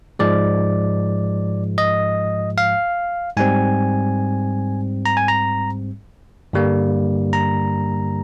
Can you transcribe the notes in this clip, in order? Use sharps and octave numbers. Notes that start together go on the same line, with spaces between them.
G#2 F3 G#3 D5
D#5
F5
G#2 G3 C4 G#5
A#5
G#5
A#5
G2 D3 G3 A#3
A#5